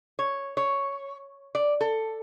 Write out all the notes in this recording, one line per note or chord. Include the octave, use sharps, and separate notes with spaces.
C#5
C#5
D5
A4